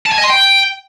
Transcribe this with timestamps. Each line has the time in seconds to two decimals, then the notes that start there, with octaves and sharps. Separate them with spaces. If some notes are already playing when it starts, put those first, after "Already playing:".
0.06 A5
0.12 G#5
0.18 D#5
0.24 C6
0.30 G5